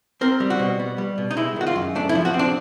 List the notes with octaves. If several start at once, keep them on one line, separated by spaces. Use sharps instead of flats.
C4 A#4
G3
F#4
B2
B3
G3
B2
D#4
G#3 E4
D#3 F#4
F4
F#2
A3 D4
E4
F3
F#4
C4
D4